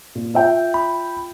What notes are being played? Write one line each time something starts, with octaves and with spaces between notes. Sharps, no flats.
A#2
F4 E5 G5
B5